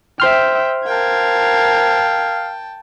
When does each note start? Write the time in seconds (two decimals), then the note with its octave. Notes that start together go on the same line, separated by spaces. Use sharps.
0.20 C5 E5 G5 C6 F6
0.86 A#4 F5 G5 A5 G#6